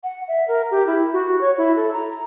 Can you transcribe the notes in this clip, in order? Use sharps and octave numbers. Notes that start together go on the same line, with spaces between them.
F#5
E5
A#4
G4
E4
F#4
C#5
E4
A4
A#5